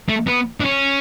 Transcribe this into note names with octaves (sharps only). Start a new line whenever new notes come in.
A3
B3
D4
C#4